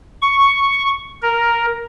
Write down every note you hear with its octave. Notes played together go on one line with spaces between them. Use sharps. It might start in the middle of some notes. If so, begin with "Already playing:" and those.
C#6
A#4